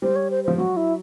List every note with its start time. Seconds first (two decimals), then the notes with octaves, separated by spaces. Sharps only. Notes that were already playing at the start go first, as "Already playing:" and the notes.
0.02 G3 C5
0.16 C#5
0.30 C5
0.44 F3 C5
0.58 F#3 F#4
0.77 E4